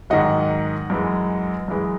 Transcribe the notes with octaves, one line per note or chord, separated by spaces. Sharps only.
G#2 D#3 F#3 D#5 F#5
F#2 E3 G#3
F#2 E3 G#3